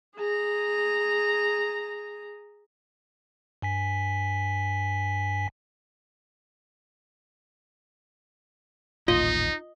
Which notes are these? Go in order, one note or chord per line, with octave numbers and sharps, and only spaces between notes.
G#4 A#5
G2 G#5 B6
D#1 A1 A#3 D#4 F4 D#5